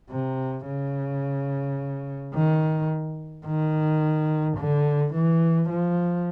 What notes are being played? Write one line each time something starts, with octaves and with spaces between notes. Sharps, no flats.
C3
C#3
D#3
D#3
D3
E3
F3